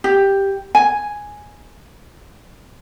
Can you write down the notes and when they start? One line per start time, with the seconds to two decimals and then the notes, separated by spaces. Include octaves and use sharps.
0.04 G4
0.75 G#5